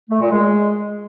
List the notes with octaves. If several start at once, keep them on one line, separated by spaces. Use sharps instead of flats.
A3
A#2
G#3